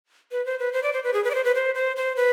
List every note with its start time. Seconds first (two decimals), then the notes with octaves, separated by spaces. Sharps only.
0.32 B4
0.46 C5
0.59 B4
0.73 C5
0.83 D5
0.93 C5
1.04 B4
1.14 G#4
1.24 B4
1.31 D5
1.35 C5
1.45 B4
1.55 C5
1.75 C5
1.96 C5
2.16 B4